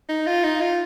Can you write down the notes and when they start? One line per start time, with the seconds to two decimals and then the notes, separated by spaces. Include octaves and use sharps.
0.09 D#4
0.27 F4
0.43 D#4
0.61 F4